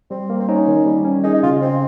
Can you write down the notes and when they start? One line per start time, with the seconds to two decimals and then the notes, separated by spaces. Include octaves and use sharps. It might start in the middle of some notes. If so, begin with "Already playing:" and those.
0.11 G3 C4
0.30 A#3
0.40 C4
0.49 C#4 D#4
0.68 D#3
0.86 G3
1.05 C#4
1.24 D#4 G#4
1.34 D#4
1.43 C#3 F4
1.61 C4 C#4